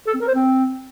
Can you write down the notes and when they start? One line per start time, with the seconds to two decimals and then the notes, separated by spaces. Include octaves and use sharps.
0.07 A4
0.14 C4
0.21 A#4
0.27 C5
0.34 C4